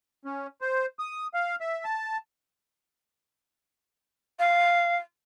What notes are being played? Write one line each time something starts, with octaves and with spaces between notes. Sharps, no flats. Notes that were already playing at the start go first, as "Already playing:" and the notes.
C#4
C5
D#6
F5
E5
A5
F5